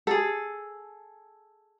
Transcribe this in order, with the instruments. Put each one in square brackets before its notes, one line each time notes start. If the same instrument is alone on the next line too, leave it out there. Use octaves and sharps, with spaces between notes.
[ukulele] G#4 A4